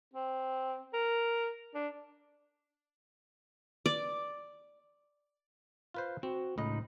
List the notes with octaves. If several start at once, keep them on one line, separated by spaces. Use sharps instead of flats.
C4
A#4
D4
D5
F4 B4 C5
C4 F#4
C#2 A2 D#4 D#5 B5